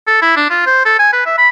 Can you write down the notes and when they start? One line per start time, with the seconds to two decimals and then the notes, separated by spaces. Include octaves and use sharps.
0.07 A4
0.22 E4
0.36 D4
0.50 F4
0.66 C5
0.85 A4
0.99 G#5
1.13 B4
1.26 E5
1.38 B5